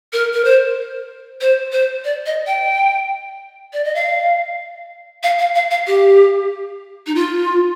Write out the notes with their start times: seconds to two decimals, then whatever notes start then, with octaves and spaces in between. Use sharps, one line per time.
0.13 A#4
0.33 A#4
0.45 C5
1.41 C5
1.72 C5
2.05 D5
2.26 D#5
2.47 G5
3.73 D5
3.85 D#5
3.95 F5
5.23 F5
5.39 F5
5.55 F5
5.71 F5
5.87 G4
7.07 D#4
7.15 F4